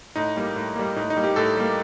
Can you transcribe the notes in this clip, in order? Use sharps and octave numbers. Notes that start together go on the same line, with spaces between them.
A2 D#4
G3 A#3
A2
G3 A#3
A2 D#4
D#4
G3 A#3
G4
A2 A4
G3 A#3